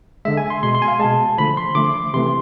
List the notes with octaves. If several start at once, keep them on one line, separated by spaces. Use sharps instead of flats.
D3 G#3 E5
G#5
C6
B2 G#3 C6
C6
G#5
F5
B2 G#3 A5
D3 F3 A3 B5
C6
D3 F3 A3 D6
C3 E3 A3 C6